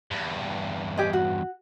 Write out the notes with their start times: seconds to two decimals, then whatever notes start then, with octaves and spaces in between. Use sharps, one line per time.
0.11 E2 G2
0.97 G4 G#4 D#5
1.13 F#4